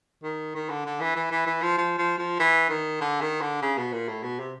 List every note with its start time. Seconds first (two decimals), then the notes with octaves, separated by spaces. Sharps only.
0.23 D#3
0.55 D#3
0.69 D3
0.86 D3
1.00 E3
1.16 E3
1.31 E3
1.46 E3
1.62 F3
1.78 F3
1.98 F3
2.18 F3
2.40 E3
2.69 D#3
3.01 D3
3.21 D#3
3.41 D3
3.62 C#3
3.77 B2
3.92 A#2
4.08 A2
4.23 B2
4.39 C3